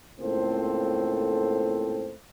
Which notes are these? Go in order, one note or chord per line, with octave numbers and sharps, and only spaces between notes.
C#2 A2 A#3 C4 A4 C5